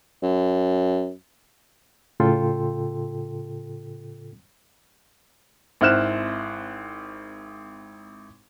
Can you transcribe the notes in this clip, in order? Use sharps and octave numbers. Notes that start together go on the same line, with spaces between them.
F#2
A2 C#3 F4 A4 G5 C6
G#1 C4 E4 F6 F#6 E7